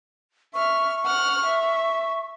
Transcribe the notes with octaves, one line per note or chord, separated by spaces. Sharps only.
E5 C#6 F6
F#5 F6
E5